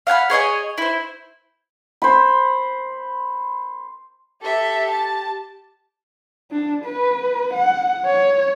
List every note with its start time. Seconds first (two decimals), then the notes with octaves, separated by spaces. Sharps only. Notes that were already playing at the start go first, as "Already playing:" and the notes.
0.07 F5 F#5 G#5 B5
0.30 G#4 C#5 D#5 G#5
0.78 E4 C5
2.02 C5 B5
4.42 G4 A4 E5
4.91 A5
6.51 D4
6.85 B4
7.53 F#5
8.06 C#5